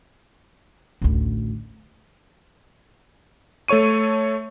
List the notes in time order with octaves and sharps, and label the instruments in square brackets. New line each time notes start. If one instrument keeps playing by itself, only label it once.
[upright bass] A1 D2
[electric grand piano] A3 A4 C#5 C#6 D#7